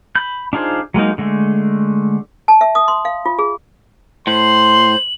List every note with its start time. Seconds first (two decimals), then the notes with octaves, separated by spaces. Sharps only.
0.15 B5 G6
0.53 D4 D#4 F4 G#4 C5
0.94 F#3 G#3 A#3 D#4
1.18 D3 G#3 A3
2.48 A5
2.61 E5
2.75 D#6
2.88 C6
3.05 F5
3.26 F4
3.39 G#4
4.27 A2 C5 C6 F#7